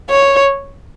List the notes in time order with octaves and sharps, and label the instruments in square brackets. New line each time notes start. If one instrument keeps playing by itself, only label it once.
[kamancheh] C#5